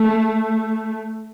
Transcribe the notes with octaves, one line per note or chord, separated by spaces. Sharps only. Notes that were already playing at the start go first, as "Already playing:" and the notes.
Already playing: A3